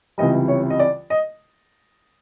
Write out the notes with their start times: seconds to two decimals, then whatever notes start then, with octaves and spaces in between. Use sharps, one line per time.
0.18 C#2 C3 E3 G3 D#5
0.48 C#5
0.70 D#5
0.79 D5
1.10 D#5